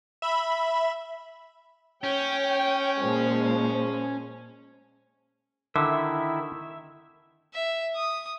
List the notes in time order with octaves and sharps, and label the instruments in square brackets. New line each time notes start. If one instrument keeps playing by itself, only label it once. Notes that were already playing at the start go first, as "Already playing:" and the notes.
[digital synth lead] E5 [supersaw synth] B5
[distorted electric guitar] C#4 [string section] C#5 G5
[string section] A#2 F3 G#3
[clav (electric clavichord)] D3 [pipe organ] D#3 E4 [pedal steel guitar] E5
[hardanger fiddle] E5
D#6